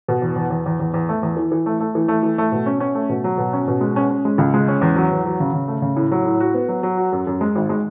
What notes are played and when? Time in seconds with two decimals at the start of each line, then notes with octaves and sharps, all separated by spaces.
0.08 B2
0.22 E2
0.36 E2
0.50 E2
0.66 E2
0.80 E2
0.94 E2
1.09 A3
1.23 E2
1.37 E3
1.52 E3
1.66 A3
1.80 A3
1.95 E3
2.08 A3
2.23 E3
2.38 A3
2.52 B2
2.66 C#4
2.80 C#4
2.95 A3
3.09 B2
3.24 F#3
3.38 B2
3.53 C#4
3.68 B2
3.81 G#3
3.96 C#4
4.10 C#4
4.25 G#3
4.38 C#2
4.54 G#3
4.68 C#4
4.81 E2
4.96 F#3
5.11 E2
5.26 F#3
5.40 C#3
5.53 C#3
5.68 A3
5.82 C#3
5.96 A2
6.11 F#3
6.25 A2
6.40 F#4
6.54 B3
6.68 F#3
6.83 F#3
6.97 F#4
7.12 F#2
7.27 F#2
7.41 G#3
7.55 G#1
7.69 G#3